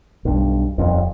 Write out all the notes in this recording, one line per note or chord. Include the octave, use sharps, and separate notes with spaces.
B1 G2
D#1 F2